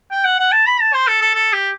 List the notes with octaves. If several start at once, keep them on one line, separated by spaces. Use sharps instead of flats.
G5
F#5
F#5
A5
B5
A5
C5
A4
A4
A4
G4